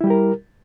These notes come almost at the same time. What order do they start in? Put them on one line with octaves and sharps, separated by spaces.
E4 G3 G4 A#4